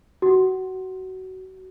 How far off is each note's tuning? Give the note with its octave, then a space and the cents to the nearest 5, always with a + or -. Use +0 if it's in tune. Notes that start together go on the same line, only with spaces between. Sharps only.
F#4 +20